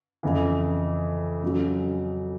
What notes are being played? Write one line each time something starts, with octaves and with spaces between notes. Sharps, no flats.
F2 C#3 E3
F2 C#3 F#3